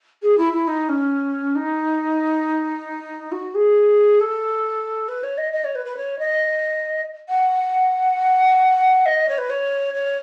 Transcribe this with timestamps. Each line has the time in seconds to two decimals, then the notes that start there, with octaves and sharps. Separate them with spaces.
0.22 G#4
0.37 E4
0.52 E4
0.67 D#4
0.89 C#4
1.55 D#4
3.31 F#4
3.54 G#4
4.20 A4
5.08 B4
5.23 C#5
5.37 D#5
5.52 D#5
5.64 C#5
5.75 B4
5.85 B4
5.97 C#5
6.18 D#5
7.29 F#5
9.05 D#5
9.28 C#5
9.38 B4
9.50 C#5
9.94 C#5